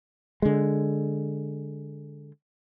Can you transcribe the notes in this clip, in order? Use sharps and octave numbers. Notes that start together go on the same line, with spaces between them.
D3 G#3